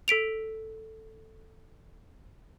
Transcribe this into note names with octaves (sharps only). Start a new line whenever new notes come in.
A4 B6 D7 F7